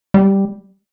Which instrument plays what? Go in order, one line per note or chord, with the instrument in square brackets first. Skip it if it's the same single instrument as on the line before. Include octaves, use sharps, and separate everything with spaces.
[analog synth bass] G3